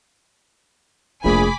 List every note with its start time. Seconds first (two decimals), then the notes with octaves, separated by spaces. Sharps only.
1.24 F1 A#1 A3 G#4 G#5 B5 D6